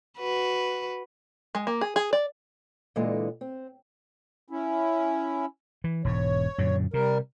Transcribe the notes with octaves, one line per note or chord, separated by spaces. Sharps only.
F#4 B4
G#3
A#3
G#4
G#4
D5
A#2 D3 E3 G#3 A4 D#5
C4
C#4 E4
E3
E1 G#2 C#5
F#2 A#2 D3
C3 G3 A#4